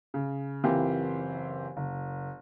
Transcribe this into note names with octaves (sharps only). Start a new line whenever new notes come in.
C#3
F#1 E3 C4 F4 G4 A#4
F#1